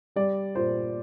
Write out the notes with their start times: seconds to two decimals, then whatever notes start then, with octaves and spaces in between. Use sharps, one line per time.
0.16 G3 D5
0.55 A#2 C5